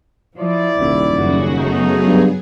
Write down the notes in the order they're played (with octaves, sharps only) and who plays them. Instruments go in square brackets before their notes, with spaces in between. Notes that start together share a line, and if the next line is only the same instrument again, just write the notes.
[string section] F3 [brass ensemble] E4 D5
[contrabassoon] D#1 [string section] C2
[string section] F#2 C#3 F#4
[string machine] F#3 B3 G#4 [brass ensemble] A3 D#4
[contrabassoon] G2